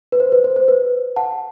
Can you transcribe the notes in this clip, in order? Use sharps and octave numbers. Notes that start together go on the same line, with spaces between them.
B4
C5
B4
C5
C5
B4
F#5 A5